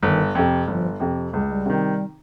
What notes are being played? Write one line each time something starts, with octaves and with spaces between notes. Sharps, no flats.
G1 D#3
F2 C3
G1 F3
F2 C3
C#2 G3
G#3
G3
C3 D#3